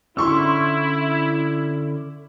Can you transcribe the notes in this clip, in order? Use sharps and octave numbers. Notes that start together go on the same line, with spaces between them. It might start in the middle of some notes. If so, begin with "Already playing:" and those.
D3 C#4 E4 C6 C#6 E6